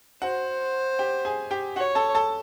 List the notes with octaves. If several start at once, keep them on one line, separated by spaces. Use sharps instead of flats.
F#4 C5 F#5
G4 G5
G#4 G#5
G4 G5
F#4 C#5 F#5
A4 A5
A4 A5